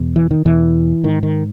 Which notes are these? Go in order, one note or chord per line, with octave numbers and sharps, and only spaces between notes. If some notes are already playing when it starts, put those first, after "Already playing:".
Already playing: E2 B2
E3
D#3
E2 B2 E3
G#2 D#3
D#3